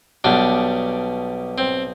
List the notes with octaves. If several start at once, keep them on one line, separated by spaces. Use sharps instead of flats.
B1 B2 G3 D4
C4